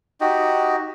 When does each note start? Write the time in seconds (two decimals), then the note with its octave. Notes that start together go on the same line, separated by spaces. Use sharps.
0.21 D#4 F#4 G4